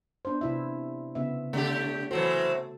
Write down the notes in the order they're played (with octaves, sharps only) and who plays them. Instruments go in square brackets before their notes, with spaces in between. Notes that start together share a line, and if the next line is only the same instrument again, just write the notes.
[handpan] B3 D4 C5
C3 E4 E5
C#3 B3 E5
[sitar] C#3 G4 [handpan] A3
[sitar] E3 F#3 C4 [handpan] F#4 A4